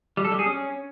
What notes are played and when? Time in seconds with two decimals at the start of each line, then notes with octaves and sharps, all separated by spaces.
0.17 G3
0.25 A4
0.32 G3
0.39 G#4
0.46 C#4